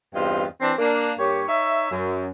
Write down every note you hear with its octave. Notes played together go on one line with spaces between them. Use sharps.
E2 G2 C4 F4 D#5
E3 C4 D4
A#3 D4
G2 A#3 G4 C#5
D#4 C#5 E5
F#2